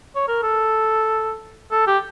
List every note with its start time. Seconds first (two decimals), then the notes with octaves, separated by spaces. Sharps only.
0.15 C#5
0.28 A#4
0.42 A4
1.72 A4
1.87 G4